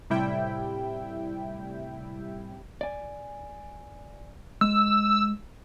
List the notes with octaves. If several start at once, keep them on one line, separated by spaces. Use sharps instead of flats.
A2 C3 G3 E4 E5 G5
D5 G#5
G#3 E6